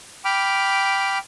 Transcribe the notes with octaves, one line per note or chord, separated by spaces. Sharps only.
G5 B5 D6 F6